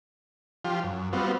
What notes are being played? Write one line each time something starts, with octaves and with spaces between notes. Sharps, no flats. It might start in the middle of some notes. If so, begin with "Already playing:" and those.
F3 F4 G4
F#2
G3 B3 C4 F4 F#4